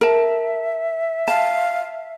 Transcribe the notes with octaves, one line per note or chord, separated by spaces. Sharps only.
A#4 E5 A5
F5 A5